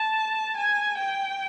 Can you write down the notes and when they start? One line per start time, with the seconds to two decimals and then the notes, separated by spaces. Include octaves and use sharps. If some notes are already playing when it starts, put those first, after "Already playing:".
Already playing: A5
0.57 G#5
0.98 G5